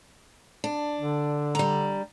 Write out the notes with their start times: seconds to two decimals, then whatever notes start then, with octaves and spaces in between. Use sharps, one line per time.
0.64 D4
0.99 D3
1.55 G3 A#5